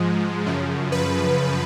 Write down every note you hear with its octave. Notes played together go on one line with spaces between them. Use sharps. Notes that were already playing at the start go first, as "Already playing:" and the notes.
Already playing: G#2 F3 G#3
F#2 C#3 F3
B4